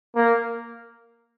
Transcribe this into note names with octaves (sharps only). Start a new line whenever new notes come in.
A#3